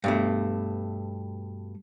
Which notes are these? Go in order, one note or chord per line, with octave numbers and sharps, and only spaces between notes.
G2 B2 A3